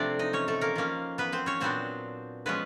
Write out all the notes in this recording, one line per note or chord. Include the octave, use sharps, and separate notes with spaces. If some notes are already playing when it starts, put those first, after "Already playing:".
Already playing: C3 F3 A3 C4 D4 D5
D#4 D#5
C#4 C#5
A3 A4
A#3 A#4
F3 A#3 C#4
B3 B4
C4 C5
C#4 C#5
A#2 F#3 B3 C4 D4 C5
F3 G#3 B3 C#4 B4